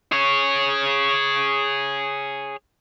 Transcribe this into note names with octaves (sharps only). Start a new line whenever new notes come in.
G#4 C#5